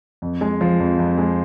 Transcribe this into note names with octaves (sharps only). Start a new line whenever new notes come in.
F2
G#3
F3
F2
F2
G#3